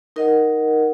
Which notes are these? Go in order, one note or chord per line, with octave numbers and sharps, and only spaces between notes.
D#4 A#4 D#5 F#5